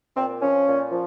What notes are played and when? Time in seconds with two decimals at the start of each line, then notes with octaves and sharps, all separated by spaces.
0.16 A#2 C4
0.41 F3 C#4
0.67 A#2
0.92 F3